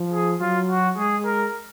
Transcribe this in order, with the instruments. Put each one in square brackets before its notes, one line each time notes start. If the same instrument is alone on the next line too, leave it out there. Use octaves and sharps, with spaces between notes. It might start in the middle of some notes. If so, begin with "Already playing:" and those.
Already playing: [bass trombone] F3
[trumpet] G#4
[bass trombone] F#3 [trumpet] F4
[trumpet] F#4
[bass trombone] G#3 [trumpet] G#4
[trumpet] A#4